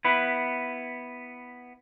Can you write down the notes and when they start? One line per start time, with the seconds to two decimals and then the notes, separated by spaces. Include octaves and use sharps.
0.05 B3 E4 B4